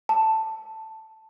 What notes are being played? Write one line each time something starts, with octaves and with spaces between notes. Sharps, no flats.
A5